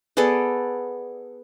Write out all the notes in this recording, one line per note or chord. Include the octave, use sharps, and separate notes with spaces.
B3 G#4 A4 D5